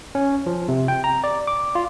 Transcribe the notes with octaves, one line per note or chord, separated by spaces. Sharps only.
C#4
F3
C3
G5
A#5
D5
D6
F4